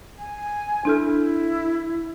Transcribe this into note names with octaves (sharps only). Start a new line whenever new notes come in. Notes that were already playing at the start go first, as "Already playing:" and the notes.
G#5
D4 E4 A4 F6